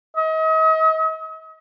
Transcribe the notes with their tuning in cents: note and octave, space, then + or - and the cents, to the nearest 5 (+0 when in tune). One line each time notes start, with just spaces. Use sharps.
D#5 +40